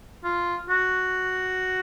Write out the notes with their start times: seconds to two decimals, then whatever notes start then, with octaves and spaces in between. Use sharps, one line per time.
0.24 F4
0.69 F#4